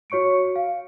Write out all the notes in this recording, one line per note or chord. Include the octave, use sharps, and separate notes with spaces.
F#4 C#5 C#6 C#7 D7
F5